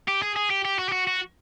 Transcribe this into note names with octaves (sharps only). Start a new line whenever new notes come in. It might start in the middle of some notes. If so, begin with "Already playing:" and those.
G4
G#4
G#4
G4
G4
F#4
G4
F#4
F#4